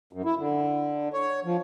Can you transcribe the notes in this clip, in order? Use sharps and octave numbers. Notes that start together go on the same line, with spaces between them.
F#2
E4
D3
C#5
F3